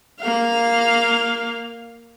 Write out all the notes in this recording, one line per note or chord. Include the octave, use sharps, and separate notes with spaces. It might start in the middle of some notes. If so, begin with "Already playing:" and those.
A#3 F5